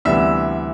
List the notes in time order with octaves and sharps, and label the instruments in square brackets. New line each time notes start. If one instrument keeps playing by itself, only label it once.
[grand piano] D2 C3 E3 G3 B3 E5 E6